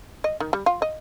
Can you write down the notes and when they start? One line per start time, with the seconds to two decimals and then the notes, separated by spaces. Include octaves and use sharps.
0.24 D#5
0.40 D#3
0.53 G3
0.66 F4
0.82 D#5